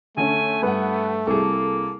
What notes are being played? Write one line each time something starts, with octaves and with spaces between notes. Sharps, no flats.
D3 A3 C#4 G#5
G2 B3 B4 F#5
C2 A#3 G#4 A4